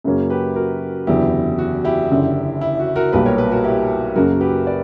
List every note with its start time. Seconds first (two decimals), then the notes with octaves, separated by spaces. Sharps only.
0.04 F#2 C#3 F#3 A#3 C#4
0.30 G4 B4
0.56 F#4 A#4
1.07 F#1 E2 D3 F#3 B3 E4 G4
1.58 F#4
1.85 E4 G4
2.10 F#1 F#2 D3
2.61 E4
2.79 F#4
2.96 F#4 A#4
3.12 B1 A#2 G3 G4 B4
3.26 A#4 C#5
3.38 G4 B4
3.52 F#4 A#4
3.64 E4 G4
4.16 F#2 C#3 F#3 A#3 F#4 A#4
4.41 G4 B4
4.66 B4 D5